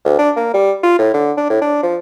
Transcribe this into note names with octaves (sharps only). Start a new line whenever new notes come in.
D2
D4
A#3
G3
F4
A2
D3
D4
A2
D4
F3